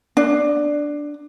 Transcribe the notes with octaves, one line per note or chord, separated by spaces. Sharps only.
D4